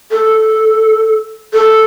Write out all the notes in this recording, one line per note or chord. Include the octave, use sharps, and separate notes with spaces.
A4
A4